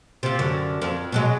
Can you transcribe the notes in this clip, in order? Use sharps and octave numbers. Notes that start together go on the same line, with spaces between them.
C3 F4
F#2 D3
F2
B2 F#3 G#3